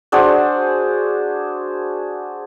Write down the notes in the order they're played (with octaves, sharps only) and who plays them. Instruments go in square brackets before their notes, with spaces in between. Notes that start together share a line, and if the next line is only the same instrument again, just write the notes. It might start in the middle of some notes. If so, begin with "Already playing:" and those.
[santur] D4 F#4 G#4 C5